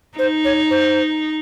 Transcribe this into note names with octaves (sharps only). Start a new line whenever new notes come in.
D#4 C5
C#5
C5